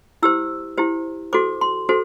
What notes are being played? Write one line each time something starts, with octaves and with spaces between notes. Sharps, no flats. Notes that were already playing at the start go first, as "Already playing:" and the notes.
E4 G4 C5 E6
E4 G4 C5
F#4 A4 C5 D6
C6
F#4 A4 C5